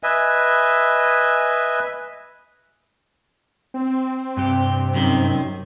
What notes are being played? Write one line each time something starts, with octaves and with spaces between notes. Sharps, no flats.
B4 D#5 E5 G#5
C4
G2 C3 G4
F#2 D#3